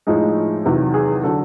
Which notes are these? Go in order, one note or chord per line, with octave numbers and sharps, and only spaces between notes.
A2 F3 G#3 D#4
E2 C3 D#3 F#3
G#4
D3 F#3 A4